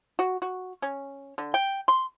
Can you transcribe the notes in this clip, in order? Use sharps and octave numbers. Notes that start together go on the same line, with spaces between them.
F#4
F#4
C#4
D3
G5
C6